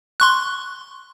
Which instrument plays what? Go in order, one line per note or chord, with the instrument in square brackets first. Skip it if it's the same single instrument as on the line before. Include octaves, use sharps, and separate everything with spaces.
[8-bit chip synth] C6 C#6 F#6